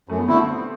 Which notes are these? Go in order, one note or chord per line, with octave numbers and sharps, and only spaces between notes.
F#2 A3
B3
D3 A3 C4 E4